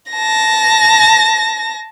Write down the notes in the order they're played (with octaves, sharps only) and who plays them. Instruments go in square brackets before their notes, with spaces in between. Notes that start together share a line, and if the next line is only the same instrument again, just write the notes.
[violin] A5 A#6